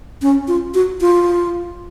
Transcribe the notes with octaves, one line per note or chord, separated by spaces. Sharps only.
C#4
F4
F#4
F4